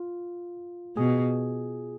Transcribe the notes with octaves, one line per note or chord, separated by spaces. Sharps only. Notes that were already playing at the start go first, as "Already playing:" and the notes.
Already playing: F4
B2 G#4